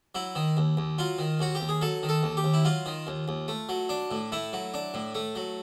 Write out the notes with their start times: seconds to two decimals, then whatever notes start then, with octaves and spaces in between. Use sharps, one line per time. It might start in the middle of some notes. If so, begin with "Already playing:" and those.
0.15 F#3 E4
0.35 D#3
0.57 D#2
0.77 D#2
0.98 F#3 F4
1.19 D#3
1.39 D#2 F#4
1.55 G4
1.60 D#2
1.69 G#4
1.81 F#3 A4
2.03 D#3
2.09 A4
2.23 D#2
2.37 G4
2.44 D#2
2.54 E4
2.65 F#3 F4
2.86 D#3
3.07 D#2
3.28 D#2
3.48 A3
3.69 F#3
3.89 D4
4.11 A2
4.32 A3 E4
4.53 F#3
4.74 D4
4.94 A2
5.15 A3
5.35 F#3